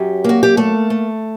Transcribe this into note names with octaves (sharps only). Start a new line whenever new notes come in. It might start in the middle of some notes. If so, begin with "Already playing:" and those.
Already playing: F#2 F#3 G4
A#3 F#4
G4
A3 A4
A3